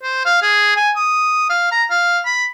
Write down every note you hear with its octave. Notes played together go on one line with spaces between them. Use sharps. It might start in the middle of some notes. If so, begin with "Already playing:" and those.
C5
F5
G#4
G#5
D#6
F5
A#5
F5
B5